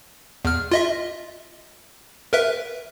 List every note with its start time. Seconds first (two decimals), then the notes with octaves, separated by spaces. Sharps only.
0.45 E2 F6
0.71 F4 D#5 E5
2.33 A#4 B4 E5